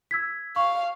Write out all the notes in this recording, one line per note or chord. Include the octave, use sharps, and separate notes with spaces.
E6 G#6 B6
F5 C#6